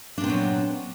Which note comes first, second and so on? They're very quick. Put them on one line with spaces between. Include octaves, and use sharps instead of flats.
D4 A#2 C4 B3 F#3